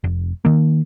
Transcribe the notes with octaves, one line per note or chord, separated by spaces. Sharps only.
F1
D#3 A#3